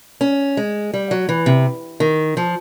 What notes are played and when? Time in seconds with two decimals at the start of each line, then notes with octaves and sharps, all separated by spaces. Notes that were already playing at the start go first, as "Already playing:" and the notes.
0.21 C#4
0.57 G#3
0.94 G3
1.11 F#3
1.29 E3
1.46 C3
2.00 D#3
2.37 F3